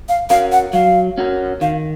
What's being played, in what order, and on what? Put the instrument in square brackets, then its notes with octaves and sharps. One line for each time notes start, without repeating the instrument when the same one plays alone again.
[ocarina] F5
[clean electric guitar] C#4 F#4 A#4 [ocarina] F5
[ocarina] F#5
[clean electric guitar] F#3 [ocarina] F5
[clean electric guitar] C#4 F#4 A#4
[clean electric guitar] D#3 [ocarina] F5